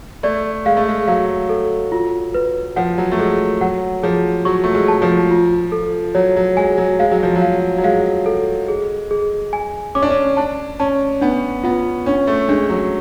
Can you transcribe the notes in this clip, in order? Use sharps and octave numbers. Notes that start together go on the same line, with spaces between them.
A3 D5
G#3 F5
A3
G#3
F#3 F5
A4
F4
B4
F3 F#5
F#3
A3
G#3 A4
F#3 F#5
F3 G#4
F#3 C#6
A3
G#3
A5
F3
F4
A4
F#3 C#5
F#3
G#3 G#5
F#3
G#3 F5
F#3
F3
F#3
F5
F#3
G#3 F5
A4
G#4
G#4
G#5
C#4 D6
D4
C#4
D4 A5
C#4 A5
B3 D4
B3 F4
C#4 D4
A3
G#3 D4
F#3